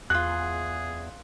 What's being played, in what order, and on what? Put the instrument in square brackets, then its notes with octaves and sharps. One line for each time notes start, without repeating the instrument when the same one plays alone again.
[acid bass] E2 [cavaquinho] F4 F#4 [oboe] G#4 [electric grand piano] F#6